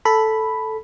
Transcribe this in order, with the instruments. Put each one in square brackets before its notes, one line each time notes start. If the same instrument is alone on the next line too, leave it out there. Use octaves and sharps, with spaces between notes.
[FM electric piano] A4 B5